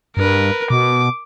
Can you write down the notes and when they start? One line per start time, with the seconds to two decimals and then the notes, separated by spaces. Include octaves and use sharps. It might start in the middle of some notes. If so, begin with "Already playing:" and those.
0.17 G2 A#4 B4
0.70 B2 D6